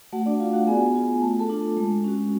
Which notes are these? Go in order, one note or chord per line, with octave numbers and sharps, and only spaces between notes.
A3 F#4 F#5
D4 D5
F4 F5
F#4 F#5
B3 G#4 G#5
F4
A3 A5
A4 A5
D4 F4
G#3
C#4 F#4